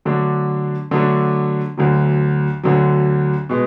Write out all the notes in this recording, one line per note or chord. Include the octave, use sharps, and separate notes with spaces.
D3 F#3 A3 D4
D3 F#3 A3 D4
D2 D3 F#3
D2 D3 F#3
B2 G#3